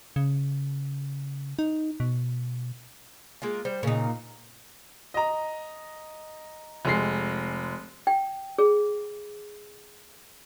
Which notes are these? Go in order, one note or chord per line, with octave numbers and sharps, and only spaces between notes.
C#3
D#4
B2
G#3 A#3 F4
G3 C5
A#2 C#3 D#4
D#5 A#5
F1 G#3 C7
G5
G#4